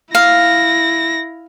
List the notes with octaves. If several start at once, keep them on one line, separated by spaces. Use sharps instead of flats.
E4 F5 A#6